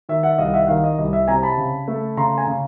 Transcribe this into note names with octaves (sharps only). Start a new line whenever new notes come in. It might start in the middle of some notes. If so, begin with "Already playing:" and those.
D#3 E5
E5 F#5
C2 D#5 F5
E5 F#5
F#5
D#3 D#5 F5
D#5
C2 D#5
E5
C3 G#5 A#5
A5 B5
C#3
A3
C#3 A#5 C6
G#5 A#5
C#3